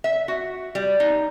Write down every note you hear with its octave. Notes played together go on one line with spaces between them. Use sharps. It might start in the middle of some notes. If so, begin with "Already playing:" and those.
E5
F#4
G3
D#4